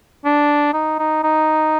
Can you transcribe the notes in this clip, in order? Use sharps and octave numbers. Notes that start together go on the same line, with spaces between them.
D4
D#4
D#4
D#4